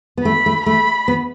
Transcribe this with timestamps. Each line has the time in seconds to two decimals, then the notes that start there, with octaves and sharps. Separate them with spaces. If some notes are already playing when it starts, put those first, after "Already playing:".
0.17 B3
0.24 A3 B5
0.46 A3
0.66 A3 B5
1.08 B3